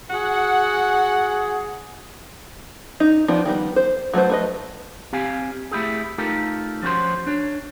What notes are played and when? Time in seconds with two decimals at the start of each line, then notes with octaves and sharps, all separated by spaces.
0.11 F#4 G#4 F#5
3.00 D#4
3.28 F3 B3 C4 D4 D#4
3.46 D#3 G3 B3
3.76 C5
4.14 F#3 A3 B4 C5
4.30 A3 B4 D#5
5.13 C4 G4 F5 G#5
5.72 A3 E4 G4 G#4
6.18 A3 D#4 F4 G4 A4 A#4
6.82 F3 C#4 F#4 C5 C6
7.27 D4 C#5